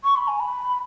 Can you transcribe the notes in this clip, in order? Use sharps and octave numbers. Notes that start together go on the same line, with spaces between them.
C#6
B5
G#5
B5